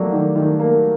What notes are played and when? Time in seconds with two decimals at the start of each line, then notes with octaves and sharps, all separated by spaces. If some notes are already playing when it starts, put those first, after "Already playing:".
Already playing: F#3 G3 A3 A#3
0.12 D#3
0.36 D#3
0.60 A#3